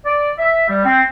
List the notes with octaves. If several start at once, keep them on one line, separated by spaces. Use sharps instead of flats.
D5
E5
G3
C4